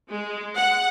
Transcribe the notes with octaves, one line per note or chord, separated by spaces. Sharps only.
G#3
F#5